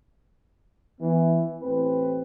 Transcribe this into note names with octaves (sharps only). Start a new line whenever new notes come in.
E3 B3
A1 C4 B4